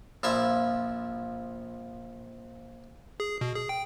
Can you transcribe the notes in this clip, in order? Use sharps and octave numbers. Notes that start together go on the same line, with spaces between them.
A#1 F3 E4 E5
G#4
B2
G#4
G5